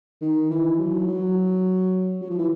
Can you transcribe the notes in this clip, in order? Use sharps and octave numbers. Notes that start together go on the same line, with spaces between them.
D#3
E3
F#3
F#3
F#3
F3
E3